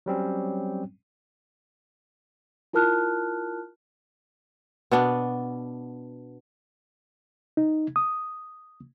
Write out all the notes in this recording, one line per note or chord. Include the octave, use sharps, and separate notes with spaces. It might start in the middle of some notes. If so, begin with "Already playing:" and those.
F#3 G3 C4 C#4
E4 F4 A#4 A5 F6 F#6
B2 B3 D4
D#4
D#6